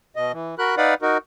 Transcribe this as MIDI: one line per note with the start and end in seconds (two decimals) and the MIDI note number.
0.16 0.32 47
0.16 0.32 75
0.32 0.55 52
0.59 0.75 66
0.59 0.75 70
0.59 0.75 83
0.59 0.75 90
0.77 0.94 63
0.77 0.94 71
0.77 0.94 74
0.77 0.94 77
0.77 0.94 78
0.77 0.94 83
1.02 1.18 63
1.02 1.18 66
1.02 1.18 70